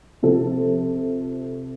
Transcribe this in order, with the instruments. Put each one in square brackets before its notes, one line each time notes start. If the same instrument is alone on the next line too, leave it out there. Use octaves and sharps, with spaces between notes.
[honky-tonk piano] C3 F3 C4 A4